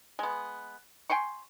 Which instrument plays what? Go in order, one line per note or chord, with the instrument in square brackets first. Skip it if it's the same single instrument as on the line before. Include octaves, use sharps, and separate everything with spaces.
[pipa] G#3 B3
G5 G#5 C6 C#6